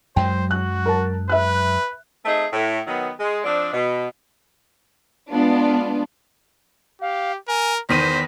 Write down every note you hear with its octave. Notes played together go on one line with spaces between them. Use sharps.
F#2 F#3 G#3 C5 G5
F#4 F#6
A#4 A5
B4 E5 F#6
A3 C4 D#4 G#4
A2
D#3 F#3 B3
G#3
F3 C4 D4
B2
G#3 B3 D4 F4
G4 F5
A#4 G#5
E2 D#3 C5 B6 D#7